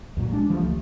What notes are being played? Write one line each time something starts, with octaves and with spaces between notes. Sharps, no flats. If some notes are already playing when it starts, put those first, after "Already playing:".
D#2 A#2 F#3
G#3 D4
E3 F3 G3 A3
C#2 A3